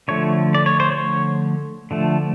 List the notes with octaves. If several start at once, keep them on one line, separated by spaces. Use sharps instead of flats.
D3 F3 A3 C#5
D5
C#5
C5
C#5
D3 F3 A3